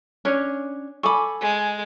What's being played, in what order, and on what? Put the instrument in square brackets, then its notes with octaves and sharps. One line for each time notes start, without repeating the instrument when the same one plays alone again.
[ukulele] C#4 D4 C#5
[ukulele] A4 B5 [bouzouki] G#5 [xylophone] C#6 D6
[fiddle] G#3